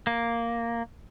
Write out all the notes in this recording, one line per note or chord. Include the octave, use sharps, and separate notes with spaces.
A#3